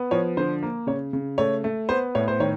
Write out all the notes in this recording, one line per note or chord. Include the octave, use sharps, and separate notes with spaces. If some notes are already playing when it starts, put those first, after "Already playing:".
Already playing: B3
F3 C#5
D3 C5
A#3
C#3 C#5
C#3
A3 C#5
A3
B3 C5
A2 C#5
C5
D#3 C#5